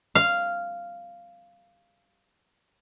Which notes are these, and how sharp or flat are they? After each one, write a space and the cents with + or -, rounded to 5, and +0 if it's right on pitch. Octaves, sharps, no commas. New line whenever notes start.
F5 -5